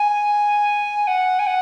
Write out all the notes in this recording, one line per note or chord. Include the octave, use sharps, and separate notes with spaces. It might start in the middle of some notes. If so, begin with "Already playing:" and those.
Already playing: G#5
F#5
G#5
F#5